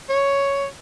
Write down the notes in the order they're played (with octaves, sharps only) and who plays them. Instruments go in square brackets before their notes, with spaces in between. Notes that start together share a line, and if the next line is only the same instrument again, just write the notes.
[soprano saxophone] C#5